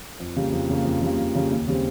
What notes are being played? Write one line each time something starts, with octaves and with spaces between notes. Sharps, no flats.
F2
C#3 G3 A#3
F2
C#3 G3 A#3
F2
C#3 G3 A#3
F2
C#3 G3 A#3
D#2
C#3 G3 C4